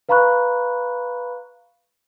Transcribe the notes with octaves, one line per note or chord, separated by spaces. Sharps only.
B4 F5 A#5 B5 C#6 F#6